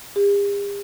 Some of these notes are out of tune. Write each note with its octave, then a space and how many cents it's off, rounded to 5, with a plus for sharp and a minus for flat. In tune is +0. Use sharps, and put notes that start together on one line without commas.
G4 +45